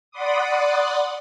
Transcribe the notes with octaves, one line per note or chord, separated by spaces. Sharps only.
D5 F#5 B5 C6 D6 D#6